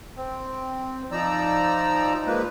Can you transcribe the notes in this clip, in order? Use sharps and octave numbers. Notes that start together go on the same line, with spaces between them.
C4
F3 D#4 D5 A#5 E6
F3 G#3 A#3 B4